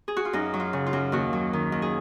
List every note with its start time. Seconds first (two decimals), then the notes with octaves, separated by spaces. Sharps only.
0.08 G#4
0.17 F#4
0.25 F4
0.33 F#2 D#4
0.54 F#3
0.60 F4
0.73 C#3
0.86 F4
0.93 F#2
1.12 D#2 F#4
1.33 F#3
1.53 D#3
1.72 D#2
1.82 G#4